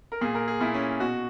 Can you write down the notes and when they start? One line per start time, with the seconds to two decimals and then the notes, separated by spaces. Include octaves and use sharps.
0.12 A#4
0.21 A#2 G#4
0.35 A#4
0.48 G#4
0.61 A#2 E4
0.74 C#4
1.00 B2 F#4